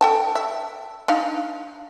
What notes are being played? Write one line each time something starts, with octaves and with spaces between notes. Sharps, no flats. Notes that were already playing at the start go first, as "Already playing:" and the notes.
A4 G5 A5
E5
D4 D#4 F5